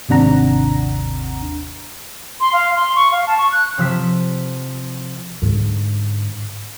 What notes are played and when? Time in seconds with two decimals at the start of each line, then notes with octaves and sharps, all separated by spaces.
0.09 G#1 D#2 C3 D4 F#5 A#5
2.40 C6
2.53 F5
2.76 C6
2.96 C#6
3.11 F5
3.27 A5
3.38 C#6
3.52 F#6
3.78 C3 F3 E6 B6
5.42 G#2 D3